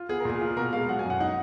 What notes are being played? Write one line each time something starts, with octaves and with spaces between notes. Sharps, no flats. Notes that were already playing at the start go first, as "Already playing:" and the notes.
Already playing: F4
B3 G#4
A#4
A#2 G#4
F4
B2 A#4
G#3 F5
F#3 F#5
G#5
F#2 F#5
D#4 F#5